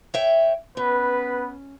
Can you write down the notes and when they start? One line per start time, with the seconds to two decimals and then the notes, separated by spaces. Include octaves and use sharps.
0.14 C#5 E5 G5
0.77 B3 C#4 B4